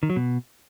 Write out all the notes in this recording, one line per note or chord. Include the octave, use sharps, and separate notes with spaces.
D#3
F#3
B2